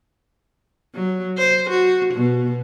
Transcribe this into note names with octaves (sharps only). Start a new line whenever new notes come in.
F#3
C5
F#4
B2